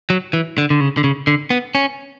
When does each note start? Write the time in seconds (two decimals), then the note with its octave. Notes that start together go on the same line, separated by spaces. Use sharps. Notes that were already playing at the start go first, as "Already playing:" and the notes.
0.10 F#3
0.33 E3
0.58 D3
0.70 D3
0.81 C#3
0.97 D3
1.04 C#3
1.27 D3
1.50 B3
1.75 C#4